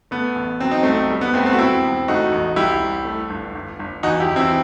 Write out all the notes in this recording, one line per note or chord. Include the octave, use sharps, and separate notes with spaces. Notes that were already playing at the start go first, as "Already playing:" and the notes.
A3 B3
A1
F#3 C4
D#4
C2 A3 C4
G3
B3
C2 A3 C4
A3 C4
F#4
E1 C4 E4
E1
A3 D#4 F#4
A1
C2 E4 G4
C2
A3
G1
G1
G1
E2 D#4 F#4
E4 G4
E2
C4 E4